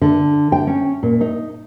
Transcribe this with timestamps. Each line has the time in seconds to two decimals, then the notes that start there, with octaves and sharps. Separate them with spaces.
0.01 D3
0.52 G5
0.67 C#4
1.03 A#2
1.21 D#4